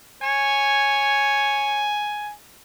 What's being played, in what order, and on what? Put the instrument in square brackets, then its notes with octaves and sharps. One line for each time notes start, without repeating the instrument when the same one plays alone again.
[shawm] C#5 [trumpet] G#5